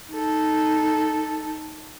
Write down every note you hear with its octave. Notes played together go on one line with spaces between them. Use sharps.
D#4 A4